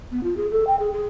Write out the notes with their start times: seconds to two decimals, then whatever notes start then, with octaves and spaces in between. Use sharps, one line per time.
0.11 B3
0.23 F4
0.37 G#4
0.51 A4
0.67 G5
0.79 G#4
0.92 G#4